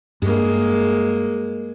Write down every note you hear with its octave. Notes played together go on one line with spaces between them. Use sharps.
G2 G#3 A#3